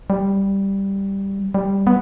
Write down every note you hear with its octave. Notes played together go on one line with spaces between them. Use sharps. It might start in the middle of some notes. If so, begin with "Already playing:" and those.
G3
G3
B3